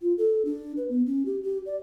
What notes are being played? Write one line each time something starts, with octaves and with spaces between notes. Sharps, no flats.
F4
A4
D4
B4
B3
C#4
G4
G4
D5